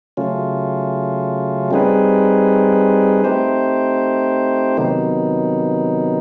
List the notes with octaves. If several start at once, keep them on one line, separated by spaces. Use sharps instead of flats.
C#3 F#3 A3 C#4 F4
G3 C4 D#4 G#4 B4
A3 C4 D#4 G4 C5
C3 D#3 F#3 B3 D#4